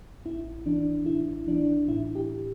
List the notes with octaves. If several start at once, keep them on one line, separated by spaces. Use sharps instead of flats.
A1 E4
E3 D4
A1 E4
E3 D4
A2 E4
G4